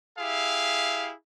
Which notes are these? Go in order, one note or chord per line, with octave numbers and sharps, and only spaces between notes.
E4 G4 G#4 E5 F5